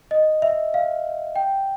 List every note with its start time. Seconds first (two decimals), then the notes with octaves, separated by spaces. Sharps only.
0.11 D#5
0.42 E5
0.74 F5
1.36 G5